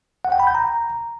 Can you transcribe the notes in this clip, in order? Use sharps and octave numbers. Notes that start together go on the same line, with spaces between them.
F#5
G5
B5
G6
A#5